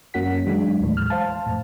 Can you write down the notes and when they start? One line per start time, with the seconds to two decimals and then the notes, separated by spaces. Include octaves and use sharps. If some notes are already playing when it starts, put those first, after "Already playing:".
0.14 F#2 A#3 C#4 F#4 F#5 B6
0.46 E3 F#3 G#3 D4
0.80 D#2 A2
0.97 F6
1.10 C5 F5 A5
1.47 F2 A2